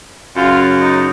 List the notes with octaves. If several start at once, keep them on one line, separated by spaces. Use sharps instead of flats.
F#2 C#3 F#3 F4
D#4